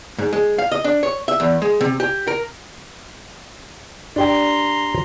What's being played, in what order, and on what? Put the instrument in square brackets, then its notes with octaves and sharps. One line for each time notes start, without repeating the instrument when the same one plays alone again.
[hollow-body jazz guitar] G#2
G#3
F5
D#5
D4
C#5
E5
E2
G#3
C3
G4
A#4
[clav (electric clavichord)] D4 G4 G5 [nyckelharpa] A#5 C6